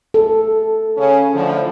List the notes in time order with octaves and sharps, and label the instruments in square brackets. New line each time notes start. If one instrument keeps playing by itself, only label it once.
[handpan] A4
[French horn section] C#3 C#4
A2 D3 F3